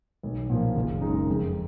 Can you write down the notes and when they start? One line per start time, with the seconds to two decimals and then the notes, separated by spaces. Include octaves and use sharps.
0.23 B1
0.50 A#2 F3 A#3
0.75 F#1
1.01 F#2 C#3 G#3 D#4
1.28 F2